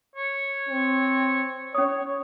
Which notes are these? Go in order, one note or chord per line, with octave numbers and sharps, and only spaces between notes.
C#5
C4
C#4 C#5 D#6